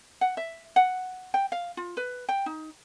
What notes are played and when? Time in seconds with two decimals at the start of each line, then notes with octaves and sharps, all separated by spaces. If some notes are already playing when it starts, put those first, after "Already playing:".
0.21 F#5
0.37 E5
0.76 F#5
1.34 G5
1.52 F5
1.77 F4
1.97 B4
2.29 G5
2.46 D#4